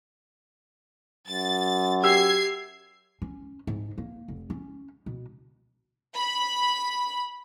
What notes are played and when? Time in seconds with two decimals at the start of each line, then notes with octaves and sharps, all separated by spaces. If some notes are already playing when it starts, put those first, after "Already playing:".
1.27 F#2 A6
2.03 G4 E6 G#6 C7
3.22 C#4
3.67 G#2
3.98 A#3
4.28 F1
4.50 C#4
5.06 B2
6.14 B5